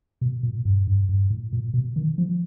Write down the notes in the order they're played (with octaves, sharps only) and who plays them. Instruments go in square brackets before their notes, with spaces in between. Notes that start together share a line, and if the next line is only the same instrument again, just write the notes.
[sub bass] B2
A#2
G2
G2
G2
A2
A#2
B2
D#3
F3